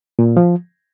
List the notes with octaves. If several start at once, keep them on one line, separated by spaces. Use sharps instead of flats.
A#2
F3